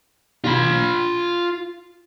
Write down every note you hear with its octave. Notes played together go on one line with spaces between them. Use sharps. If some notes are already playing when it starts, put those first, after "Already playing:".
F4 B5